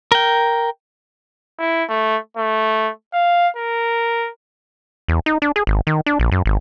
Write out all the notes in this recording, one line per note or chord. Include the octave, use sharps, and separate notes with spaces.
A#4 G5
E4
A3
A3
F5
A#4
E2
D#4
D4
G#4
G#1
D#3
D4
A#1
F#2
G#1